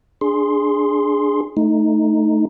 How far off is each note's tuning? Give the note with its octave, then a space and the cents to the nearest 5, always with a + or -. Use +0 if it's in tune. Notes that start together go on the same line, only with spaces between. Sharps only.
D4 +0 G#4 +0 C6 +0
A3 +0 D#4 +0